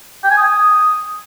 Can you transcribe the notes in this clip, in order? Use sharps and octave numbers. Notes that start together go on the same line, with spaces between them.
G5
G#5
D#6